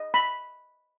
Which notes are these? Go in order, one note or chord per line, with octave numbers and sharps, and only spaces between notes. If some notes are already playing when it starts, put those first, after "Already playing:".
Already playing: D#5
B5